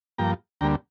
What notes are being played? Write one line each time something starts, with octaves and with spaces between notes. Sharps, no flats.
G2 F3 A#3 G5 A#5
D2 D3 G3 A#3 G5 A#5